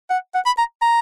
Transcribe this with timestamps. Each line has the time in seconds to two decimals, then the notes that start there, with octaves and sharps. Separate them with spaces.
0.10 F#5
0.34 F#5
0.46 B5
0.58 A#5
0.82 A#5